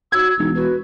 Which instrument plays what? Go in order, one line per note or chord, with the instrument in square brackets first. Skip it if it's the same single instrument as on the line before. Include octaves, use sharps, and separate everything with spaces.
[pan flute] F#4 [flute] E6 [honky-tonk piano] G#6
[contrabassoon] E1 [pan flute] D#4
[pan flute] F#4 [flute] B4